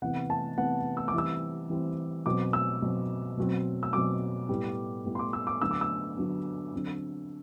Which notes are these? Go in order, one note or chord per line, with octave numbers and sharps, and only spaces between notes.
C3 E3 B3 F#5
A5
C3 E3 B3 F#5
E6
D6
E3 G3 C4 E6
E3 G3 C4
B2 F#3 C4 D6
E6
B2 F#3 C4
B2 F#3 C4
E6
B2 F#3 C4 D6
A2 G3 B3
A2 G3 B3
C6
D6
E6
D6
D3 F#3 B3 E6
D6
E6
D3 F#3 B3
D3 F#3 C4